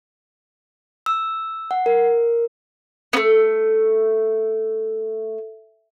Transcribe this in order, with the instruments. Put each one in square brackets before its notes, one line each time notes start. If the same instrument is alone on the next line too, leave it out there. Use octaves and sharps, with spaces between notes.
[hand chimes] E6
F#5
A#4
[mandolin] A3 B3